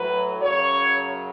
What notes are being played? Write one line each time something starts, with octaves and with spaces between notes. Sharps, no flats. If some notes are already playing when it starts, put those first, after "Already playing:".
Already playing: A2 F#3 B4
F#2 C#3 F#3 C#5